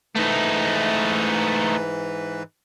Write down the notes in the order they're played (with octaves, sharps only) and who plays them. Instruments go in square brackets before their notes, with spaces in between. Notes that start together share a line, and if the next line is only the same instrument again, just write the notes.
[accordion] G#2 E3 B4 [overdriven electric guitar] A3 D#4